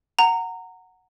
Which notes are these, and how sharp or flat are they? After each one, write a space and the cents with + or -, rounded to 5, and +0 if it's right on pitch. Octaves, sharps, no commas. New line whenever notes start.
F#5 +0 A#5 -20